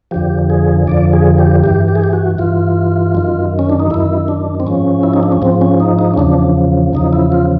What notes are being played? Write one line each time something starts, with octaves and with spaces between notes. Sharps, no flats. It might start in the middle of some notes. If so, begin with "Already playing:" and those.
F2 D3 F3 G4
G#4
F2 D3 F3 D5
G#4
G4
G2 E3 G4
G4
G#4
G4
F#4
G2 E3 F4
F#2 D#3
C#4
D4
D#4
F#2 D#3 E4
D4
C4
G#2 F3 C#4
E4
D#4
D4
C#4
G#2 F3 C4
C#4
D#4
D#4
C#4
E2 C#3 F3 D4
E2 C#3 F3 D#4
E4
F4